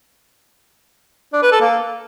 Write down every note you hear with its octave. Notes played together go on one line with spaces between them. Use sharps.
D4
B4
A4
A#3